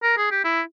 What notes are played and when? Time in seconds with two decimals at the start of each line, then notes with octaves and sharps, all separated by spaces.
0.03 A#4
0.18 G#4
0.31 G4
0.44 E4